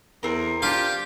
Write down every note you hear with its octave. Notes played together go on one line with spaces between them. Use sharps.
E2 C4 A#4
D4 F4 G4